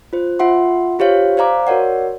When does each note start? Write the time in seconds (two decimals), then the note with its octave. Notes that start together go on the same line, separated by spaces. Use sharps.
0.13 F4 C5
0.39 F4 E5 F#5 C6
0.99 F4 G4 C5 C#5 F5
1.37 C5 D5 F5 A#5 D6
1.67 F#4 A#4 C#5 D5 F#5